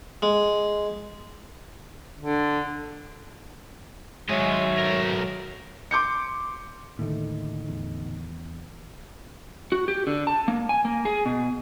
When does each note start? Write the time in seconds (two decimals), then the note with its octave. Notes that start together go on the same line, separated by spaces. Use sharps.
0.22 G#3
2.20 D3
4.29 G#2 D#3 F#3 G#3 C#5 D#5 E5
4.78 B1 A#4
5.91 C6 D6 G6 C#7
6.99 D#2 A2 D3 D#3 A3
7.69 E2
9.72 F#4
9.88 G4
10.07 D3
10.27 A5
10.48 A#3
10.69 G#5
10.85 A#3
11.05 G#4
11.26 B2